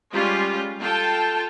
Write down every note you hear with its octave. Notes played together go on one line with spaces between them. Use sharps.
G3 G#3 C#4 F4 G4
F4 A4 G5 A5